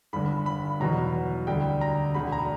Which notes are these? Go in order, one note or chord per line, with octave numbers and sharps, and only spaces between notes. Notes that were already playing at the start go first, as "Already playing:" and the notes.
G1 G2 D3 B5
B5
E2 B2 F#3 A#5
D2 D3 G3 G5
A#5
E1 D2 D3 B5
A#5